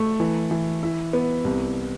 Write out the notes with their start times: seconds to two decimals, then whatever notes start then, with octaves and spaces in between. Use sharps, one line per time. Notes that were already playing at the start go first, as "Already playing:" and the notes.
Already playing: A3
0.20 E3
0.51 E3
0.83 E4
1.13 B3
1.45 C2